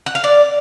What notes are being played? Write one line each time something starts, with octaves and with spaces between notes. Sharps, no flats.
F#5
F5
D5